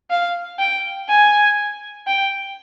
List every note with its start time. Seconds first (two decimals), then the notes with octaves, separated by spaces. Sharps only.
0.10 F5
0.59 G5
1.09 G#5
2.07 G5